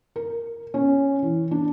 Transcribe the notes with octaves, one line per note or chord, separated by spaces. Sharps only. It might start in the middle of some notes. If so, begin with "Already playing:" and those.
A#4
C#4
E3
D4